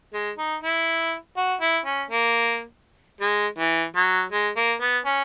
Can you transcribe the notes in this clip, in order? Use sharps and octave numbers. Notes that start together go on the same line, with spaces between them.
G#3
D#4
E4
F#4
E4
C#4
A#3
G#3
E3
F#3
G#3
A#3
B3
C#4